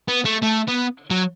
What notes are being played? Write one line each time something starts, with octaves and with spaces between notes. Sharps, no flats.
B3
A3
A3
B3
F#3